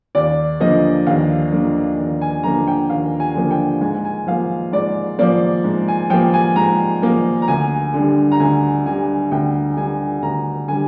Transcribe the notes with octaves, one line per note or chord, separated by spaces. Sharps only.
D#2 D5
D3 F3 A#3 D#5
D#2 F5
D3 F3 A#3
D#2
G#5
D3 F3 A#3 A#5
G5
D#2 F5
G#5
D3 F3 A#3
G5
G#2 G#5
G#5
F3 A#3 F5
G#2 D5
F3 A#3 D5
G#2
G#5
F3 A#3 G5
G#5
G#2 A#5
F3 A#3
A#5
D2 G#5
D3 G3
A#5
D2 G#5
D3 G3 G#5
D2 G5
D3 G3 G#5
D2 A#5
D3 G3 G#5